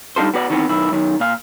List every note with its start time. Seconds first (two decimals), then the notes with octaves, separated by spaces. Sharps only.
0.16 G3 D4 D#4 F4 A4 C5
0.34 B3 F#4 D5
0.50 D#3 E3 A3 B3 C4
0.69 B1 D#3 E4
0.91 F#2 D#3
1.20 A#2 F5